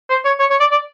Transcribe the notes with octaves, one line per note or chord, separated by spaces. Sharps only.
C5
C#5
C#5
C#5
D5
D5